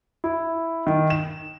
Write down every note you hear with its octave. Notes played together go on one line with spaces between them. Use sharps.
E4
D#3
E7